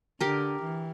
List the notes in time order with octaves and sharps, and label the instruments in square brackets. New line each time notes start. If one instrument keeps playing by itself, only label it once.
[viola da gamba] D3 [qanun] G4 A#4
[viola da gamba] E3